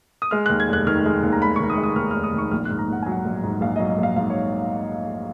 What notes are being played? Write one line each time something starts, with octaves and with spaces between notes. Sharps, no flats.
D#6
G#3 F6
D#2 F#6
G#6
F1
F#6
D#3 F6
G#3
D#2
A#5
F1 B5
D#3 C#6
D#6
G#3
D#6
D#2 F6
F1 F6
D#6
D#3 C#6
A#1 F6
G#2 F#6
A#5
A#1 F#5
F#3 G#5
F#5
A#1
G#2
A#1 F5
F#3 D#5
D#5
A#1
F5
G#2 F5
C#5